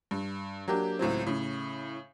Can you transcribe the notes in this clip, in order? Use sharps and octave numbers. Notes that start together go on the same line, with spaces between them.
G2
F#3 A#3 D4 G4
C#2 A2 F#3 C4
A2 C#3